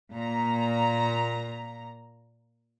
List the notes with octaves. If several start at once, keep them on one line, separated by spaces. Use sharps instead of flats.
A#2 A#5